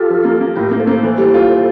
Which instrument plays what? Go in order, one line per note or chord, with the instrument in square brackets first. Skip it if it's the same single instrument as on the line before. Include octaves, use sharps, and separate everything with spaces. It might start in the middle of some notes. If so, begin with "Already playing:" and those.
Already playing: [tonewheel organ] F4 A4 [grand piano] G4
[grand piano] F3
A#3
A#3
[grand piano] A2 [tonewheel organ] G4 A#4
[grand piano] A#3
[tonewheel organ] A4 C5
[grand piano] A#3
E3
G3
F4